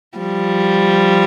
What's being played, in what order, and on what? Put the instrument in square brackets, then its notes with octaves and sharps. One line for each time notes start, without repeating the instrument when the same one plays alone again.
[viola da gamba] F3 G3